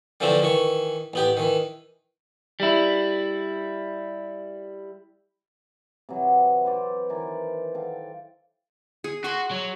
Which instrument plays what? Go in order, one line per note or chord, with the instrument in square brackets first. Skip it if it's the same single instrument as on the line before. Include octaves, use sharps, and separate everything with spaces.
[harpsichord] D3 E3 F3 A3 C4 D4
D#3 E3 C#6
A1 B3 G4
D#3 E3
[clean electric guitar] G3 E4
[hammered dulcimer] C3 E3 F#3
B4 C5 D5
D#3 E3 A#4 D5
A4 F5 G5
[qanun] G#4
[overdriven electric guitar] F#4 [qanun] G#5 C6
[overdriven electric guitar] F#3